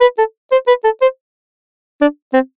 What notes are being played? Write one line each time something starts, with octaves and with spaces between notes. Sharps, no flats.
B4
A4
C5
B4
A4
C5
D4
C4